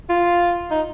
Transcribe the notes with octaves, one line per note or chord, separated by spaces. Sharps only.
F4
D#4